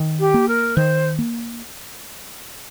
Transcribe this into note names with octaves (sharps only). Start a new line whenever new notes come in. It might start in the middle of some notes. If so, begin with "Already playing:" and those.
Already playing: D#3
G4
A#3
A#4
D#3 C5
A#3